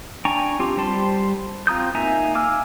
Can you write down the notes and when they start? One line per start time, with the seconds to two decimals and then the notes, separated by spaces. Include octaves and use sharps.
0.25 D4 G5 G#5 A#5 C#6
0.59 C4 F4 G4
0.77 G3 C5 A5 C6
1.67 C4 F4 A#5 D#6 G6
1.95 A#3 D#4 E5 G#5 A#5
2.34 F5 G#5 D6 E6 F6